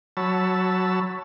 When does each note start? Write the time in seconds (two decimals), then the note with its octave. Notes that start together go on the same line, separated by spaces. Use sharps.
0.17 F#3 C#5 A5 B5 E6